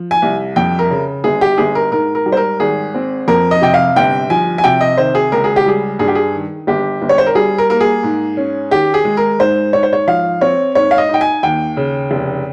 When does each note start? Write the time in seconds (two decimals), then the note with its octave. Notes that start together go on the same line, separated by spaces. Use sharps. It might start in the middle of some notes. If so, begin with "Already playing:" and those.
Already playing: F3
0.11 G#5
0.22 C2
0.56 F2 G5
0.79 A#4
0.90 C#3
1.24 G1 G#4
1.41 G4
1.58 G1 G#4
1.75 A#4
1.92 G#2 A#4
2.15 A#4
2.26 G3
2.32 C5
2.37 A#4
2.60 G#1 G#4
2.94 C4
3.28 F2 A#4
3.51 D#5
3.62 C3 G5
3.74 F5
3.96 G1 G5
4.30 F3 G#5
4.58 G#5
4.64 C3 G5
4.81 D#5
4.97 D#3 C5
5.15 G#4
5.32 C#2 A#4
5.44 G#4
5.56 G4
5.66 G3 G#4
5.99 G2 G#4
6.08 G4
6.15 G#4
6.34 D#3
6.67 G1 G4
7.02 G1
7.09 C#5
7.18 C5
7.26 A#4
7.35 G3 G#4
7.58 A#4
7.70 A#3 A#4
7.81 G#4
8.03 G#2
8.37 C#4
8.71 D#3 G4
8.94 G#4
9.05 G#3
9.17 A#4
9.39 G#2 C5
9.73 G#2 C#5
9.83 C5
9.93 C#5
10.07 F3 F5
10.41 C4 C#5
10.75 G#2 C#5
10.91 F5
10.98 D#5
11.09 D#4
11.14 G5
11.21 G#5
11.43 D#2 G5
11.77 C#3
12.11 F1